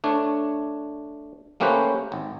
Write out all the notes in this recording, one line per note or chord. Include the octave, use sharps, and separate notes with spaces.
A3 D4 C#5
A3 A#3 C#4 G4 B4 C5
G#1